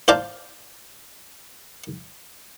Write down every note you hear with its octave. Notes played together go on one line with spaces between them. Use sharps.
C5 D5 F5 A5 A#5